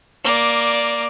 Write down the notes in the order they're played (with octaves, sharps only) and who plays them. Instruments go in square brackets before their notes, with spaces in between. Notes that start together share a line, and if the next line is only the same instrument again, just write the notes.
[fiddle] A#3 D5